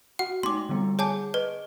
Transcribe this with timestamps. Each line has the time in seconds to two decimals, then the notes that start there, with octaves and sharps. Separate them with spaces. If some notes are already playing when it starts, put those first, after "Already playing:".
0.19 F#4 F#5
0.43 G#3 A3 D#4 C6 D6
0.69 D3 G3 B3
0.99 G#4 C#5 G#5 A5 D6
1.34 B4 D#5